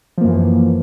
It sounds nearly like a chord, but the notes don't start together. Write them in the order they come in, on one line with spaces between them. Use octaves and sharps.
F3 A#3 F#2 E3